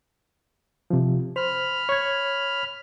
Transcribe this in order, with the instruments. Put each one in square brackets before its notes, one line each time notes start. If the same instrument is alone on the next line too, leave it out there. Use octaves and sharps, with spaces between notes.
[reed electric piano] C3 F3
[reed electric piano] C5 [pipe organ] B5 F6
[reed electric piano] C#5 G#6